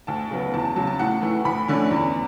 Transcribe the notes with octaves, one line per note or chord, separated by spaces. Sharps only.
D2 A5
C#3 F#3 B3
E2 A5
A5
C#3 F#3 A5
A5
A2 F#5
E3 A3
D2 B5
D3 A3 C#4
E2